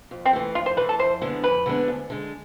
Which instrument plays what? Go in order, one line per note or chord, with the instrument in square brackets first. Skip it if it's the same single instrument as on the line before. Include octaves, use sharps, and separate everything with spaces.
[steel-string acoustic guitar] F2
[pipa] C4
[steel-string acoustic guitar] E3 A3
[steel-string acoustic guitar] F2 [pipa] F4
[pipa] C5
[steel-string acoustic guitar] E3 A3 [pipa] B4
[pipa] A4
[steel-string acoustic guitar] F2 [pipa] C5
[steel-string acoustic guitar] D3 G#3 B3 D4
[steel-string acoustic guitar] F2 [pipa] B4
[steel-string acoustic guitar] D3 G#3 B3 D4
D2
D3 G#3